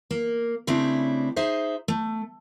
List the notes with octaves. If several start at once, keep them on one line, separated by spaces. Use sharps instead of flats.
A#3
C#3 A3 C4 D4 E4 G4
D#4 G#4 C5 E5
A3